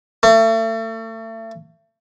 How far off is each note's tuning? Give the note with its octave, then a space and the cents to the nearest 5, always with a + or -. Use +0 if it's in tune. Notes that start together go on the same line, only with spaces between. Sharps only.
A3 +35